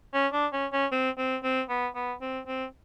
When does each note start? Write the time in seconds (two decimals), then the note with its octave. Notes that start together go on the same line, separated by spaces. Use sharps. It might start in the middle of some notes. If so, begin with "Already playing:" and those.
0.14 C#4
0.33 D4
0.53 C#4
0.73 C#4
0.92 C4
1.18 C4
1.43 C4
1.69 B3
1.95 B3
2.22 C4
2.47 C4